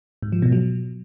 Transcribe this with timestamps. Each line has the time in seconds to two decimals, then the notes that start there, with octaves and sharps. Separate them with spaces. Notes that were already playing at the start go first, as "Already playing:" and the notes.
0.22 G#2
0.32 F3
0.42 B2
0.52 F#3